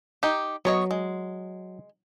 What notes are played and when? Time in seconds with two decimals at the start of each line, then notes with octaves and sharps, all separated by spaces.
0.23 D#4 G4
0.65 F#3 B3 C#5 D#5
0.91 G#3